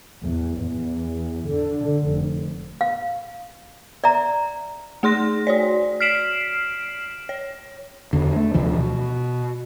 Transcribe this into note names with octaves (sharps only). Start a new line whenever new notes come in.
E2
E2
D3
F1
F5
D5 E5 A#5
A3 G#4 C6 A#6
F#4 C#5 D5
F6 B6 C7 D7 E7 F#7
C#5
E2 D3
A3
D2 C3 E3 F3
B2